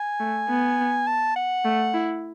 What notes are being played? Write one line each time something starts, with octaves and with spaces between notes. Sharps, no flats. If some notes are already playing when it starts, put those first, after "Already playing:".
Already playing: G#5
A3
B3
A5
F#5
A3
E4